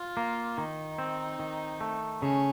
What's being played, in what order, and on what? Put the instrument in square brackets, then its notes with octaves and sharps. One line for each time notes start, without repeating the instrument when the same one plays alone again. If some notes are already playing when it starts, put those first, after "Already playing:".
Already playing: [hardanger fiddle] F4
[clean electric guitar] A#3
[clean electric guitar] D#3 [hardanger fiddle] D#4
[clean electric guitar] C4
D#3
A3
[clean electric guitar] C#3 [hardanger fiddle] C#4